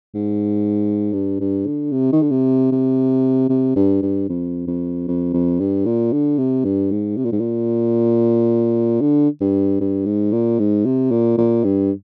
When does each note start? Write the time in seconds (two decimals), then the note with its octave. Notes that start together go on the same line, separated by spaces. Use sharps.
0.15 G#2
1.13 G2
1.40 G2
1.67 D3
1.92 C3
2.12 D#3
2.22 D3
2.31 C3
2.72 C3
3.50 C3
3.76 G2
4.02 G2
4.29 F2
4.67 F2
5.08 F2
5.33 F2
5.60 G2
5.86 A#2
6.13 D3
6.38 C3
6.65 G2
6.92 G#2
7.17 C3
7.25 A#2
7.32 G#2
7.40 A#2
9.01 D3
9.41 G2
9.81 G2
10.06 G#2
10.32 A#2
10.59 G#2
10.85 C3
11.11 A#2
11.38 A#2
11.64 G2